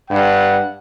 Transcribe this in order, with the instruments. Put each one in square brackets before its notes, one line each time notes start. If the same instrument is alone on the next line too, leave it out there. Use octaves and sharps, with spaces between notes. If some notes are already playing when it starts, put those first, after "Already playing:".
[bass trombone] G2 [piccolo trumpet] F#5